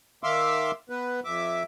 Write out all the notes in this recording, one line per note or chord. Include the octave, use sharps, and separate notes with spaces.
D#3 E5 F5 C6 D6 E6
B3 B4
F2 E5 D6